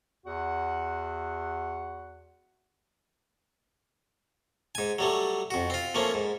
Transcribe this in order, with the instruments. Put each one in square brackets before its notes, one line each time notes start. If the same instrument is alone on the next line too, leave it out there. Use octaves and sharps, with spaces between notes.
[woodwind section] E2 F#4 F#5
[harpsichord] G#2 G#5
F#3 G3 A3
F2 F#4
C4 F4
F3 A3 A#3 C#4
G#2